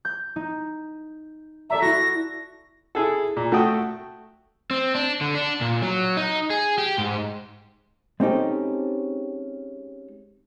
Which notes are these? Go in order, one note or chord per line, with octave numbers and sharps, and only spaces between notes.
G6
D#4
A4 D5 E5 A#5
E4 F#4 A#6
E4 G#4 A4
A#2
A3 F#4 A4 G5 D#6
C4
D4
D3
D4
A#2
F#3
D#4
G#4
G4
G#2
G#3 C4 C#4 D#4 G4 A4